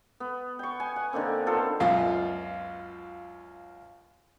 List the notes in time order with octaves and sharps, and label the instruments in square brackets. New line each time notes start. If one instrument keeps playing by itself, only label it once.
[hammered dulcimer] B3
G5 C#6
G#5
F#5
D3 D#3 A#3 C4
B3 F4 A4 C5
[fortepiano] C#2 F#2 B2 [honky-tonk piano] F4 F5